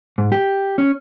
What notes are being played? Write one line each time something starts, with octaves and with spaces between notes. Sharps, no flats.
G#2
G4
C#4